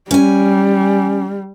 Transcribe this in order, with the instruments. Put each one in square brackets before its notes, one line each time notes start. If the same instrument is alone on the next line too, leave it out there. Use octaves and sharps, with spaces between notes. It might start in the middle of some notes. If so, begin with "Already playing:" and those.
[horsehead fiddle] G3 [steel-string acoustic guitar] C#4 G#5